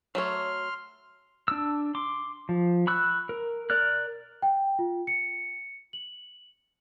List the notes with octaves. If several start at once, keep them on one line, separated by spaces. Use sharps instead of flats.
F#3 A3 C#5 C6 F6
D4 E6
C6 D6
F3
B5 C#6 E6 F#6
A#4
A#4 D5 F6 F#6
G5
F4
C#7
F#7